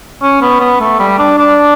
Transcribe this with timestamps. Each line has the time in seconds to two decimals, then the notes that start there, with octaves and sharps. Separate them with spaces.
0.22 C#4
0.42 B3
0.60 B3
0.80 A3
0.99 G3
1.19 D4
1.38 D4